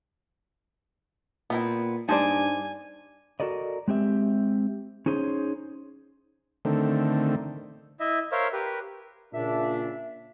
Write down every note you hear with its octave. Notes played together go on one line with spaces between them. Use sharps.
A#2 B3 C4 E4
G2 D#4 C5 D5 G#5 A5
F#4 A4 A#4 D5 D#5
G#3 C4 G4 E5
C#4 D#4 G#4 C5 C#5
D3 D#3 A3 C4
E4 D#5 E5
A#4 C5 C#5 E5 F5
G4 A#4 B4
A#2 C#3 D4 E5